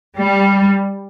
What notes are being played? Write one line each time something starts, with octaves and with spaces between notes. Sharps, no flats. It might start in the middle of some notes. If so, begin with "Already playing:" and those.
G3